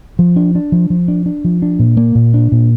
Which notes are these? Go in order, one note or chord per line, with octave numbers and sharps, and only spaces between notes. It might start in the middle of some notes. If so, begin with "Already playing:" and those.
F3
D4
D4
F3
F3
D4
D4
F3
D4
A#2
A#3
A#2
D4
A#2